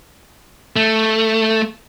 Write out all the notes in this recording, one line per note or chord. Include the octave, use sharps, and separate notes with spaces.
A3